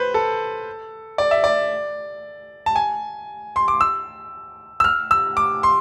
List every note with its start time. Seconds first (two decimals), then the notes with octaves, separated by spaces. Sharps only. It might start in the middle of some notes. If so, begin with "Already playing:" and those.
Already playing: B4 C5
0.14 A4
1.18 D5
1.31 E5
1.44 D5
2.66 A5
2.76 G#5
3.56 C6
3.68 D6
3.81 E6
4.80 E6
4.84 F6
5.11 E6
5.37 D6
5.63 C6